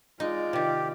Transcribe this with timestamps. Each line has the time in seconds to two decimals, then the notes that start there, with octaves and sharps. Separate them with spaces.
0.20 G#3 D#4 F4 D5
0.53 C3 D#3 G4